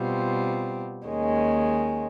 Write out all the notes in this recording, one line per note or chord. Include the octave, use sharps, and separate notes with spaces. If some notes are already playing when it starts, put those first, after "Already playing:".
Already playing: B2 G3 C4 F4
D#2 D#3 G#3 C#4